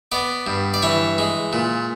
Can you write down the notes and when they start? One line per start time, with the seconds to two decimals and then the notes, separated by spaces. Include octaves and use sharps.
0.12 B3 D5
0.47 G2
0.74 D5
0.82 E3 C#5
1.18 G#3
1.53 A#2